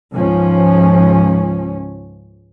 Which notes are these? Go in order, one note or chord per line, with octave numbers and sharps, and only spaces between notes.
C#2 G#2 F3 C#4